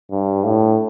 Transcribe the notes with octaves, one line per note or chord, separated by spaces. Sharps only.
G2
A2